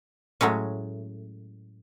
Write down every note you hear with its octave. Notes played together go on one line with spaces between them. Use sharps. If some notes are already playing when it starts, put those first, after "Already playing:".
A2 F#3 G#3 C#4